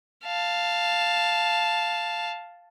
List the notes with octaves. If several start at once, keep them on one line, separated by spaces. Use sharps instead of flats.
F5 A5